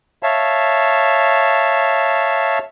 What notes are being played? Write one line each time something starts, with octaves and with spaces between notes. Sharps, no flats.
C#5 E5 F5 A5